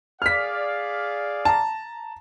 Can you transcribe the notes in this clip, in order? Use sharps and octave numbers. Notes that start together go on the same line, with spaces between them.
G#4 D5 F5 F6 B6
A5 A#5